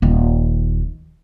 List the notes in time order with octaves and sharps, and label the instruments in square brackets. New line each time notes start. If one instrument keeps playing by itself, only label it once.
[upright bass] D#1 D#3